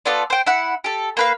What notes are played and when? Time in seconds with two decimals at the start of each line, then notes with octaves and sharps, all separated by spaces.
0.05 B3 F4 A4 D5
0.30 C5 G5
0.47 E4 F#5
0.84 G4 A4
1.17 A#3 B4 F5